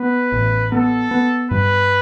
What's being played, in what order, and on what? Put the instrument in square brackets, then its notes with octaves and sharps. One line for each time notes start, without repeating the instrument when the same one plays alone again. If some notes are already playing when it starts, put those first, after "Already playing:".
Already playing: [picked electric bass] B3 [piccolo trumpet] B4
[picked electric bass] A1
[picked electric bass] B3 [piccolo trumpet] A4
[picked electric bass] B3
[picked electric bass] G2 [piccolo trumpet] B4